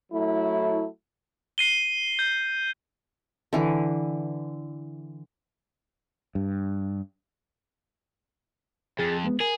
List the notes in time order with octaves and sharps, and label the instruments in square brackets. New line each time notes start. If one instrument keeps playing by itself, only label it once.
[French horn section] F#3 A3 E4
[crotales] C7 D#7 G7
G6
[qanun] D3 E3
[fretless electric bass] G2
[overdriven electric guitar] F2 [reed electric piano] G#4 A6
[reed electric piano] G#3 B3
[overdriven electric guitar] G#4 [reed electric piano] A#4